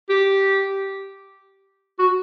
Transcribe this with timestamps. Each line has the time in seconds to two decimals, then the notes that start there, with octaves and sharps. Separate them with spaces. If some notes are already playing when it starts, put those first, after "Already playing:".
0.10 G4
1.99 F#4